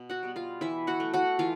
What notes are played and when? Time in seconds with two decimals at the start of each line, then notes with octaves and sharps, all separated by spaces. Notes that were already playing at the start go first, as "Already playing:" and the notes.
Already playing: B2
0.10 F#4 F#5
0.23 G3 B3
0.36 F4 F5
0.61 E3 E4 E5
0.87 F#4 F#5
1.00 A3
1.13 F#4 F#5
1.39 E3 F4 F5